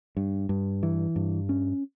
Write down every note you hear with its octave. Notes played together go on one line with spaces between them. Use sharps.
G2
G2
E3
G2
C#4